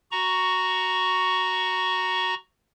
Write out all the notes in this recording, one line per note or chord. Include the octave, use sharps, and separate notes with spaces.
F#4 A#5 C#6